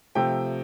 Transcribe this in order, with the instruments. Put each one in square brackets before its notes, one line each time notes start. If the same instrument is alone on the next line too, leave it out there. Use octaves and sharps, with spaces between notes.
[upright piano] C3 F3 A3 G5